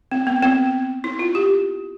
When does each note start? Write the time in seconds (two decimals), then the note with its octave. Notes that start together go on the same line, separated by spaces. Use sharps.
0.11 C4
0.27 B3
0.43 C4
1.04 E4
1.19 F4
1.35 G4